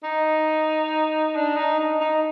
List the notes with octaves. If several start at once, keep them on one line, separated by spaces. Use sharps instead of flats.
D#4
D4
D#4
D#4
D#4